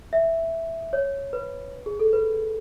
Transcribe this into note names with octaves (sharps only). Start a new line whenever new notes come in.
E5
C#5
B4
G#4
A4
B4